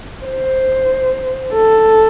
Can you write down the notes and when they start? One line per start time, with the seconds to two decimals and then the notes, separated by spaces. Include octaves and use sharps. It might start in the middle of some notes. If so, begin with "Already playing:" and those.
0.25 C5
1.53 A4